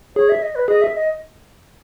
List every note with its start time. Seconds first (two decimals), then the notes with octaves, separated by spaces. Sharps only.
0.16 G#4 C#5
0.29 E5
0.42 D#5
0.55 B4
0.68 G#4 D#5
0.82 E5
0.95 D#5